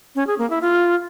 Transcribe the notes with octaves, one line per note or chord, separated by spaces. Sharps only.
C#4
G#4
A#3
E4
F4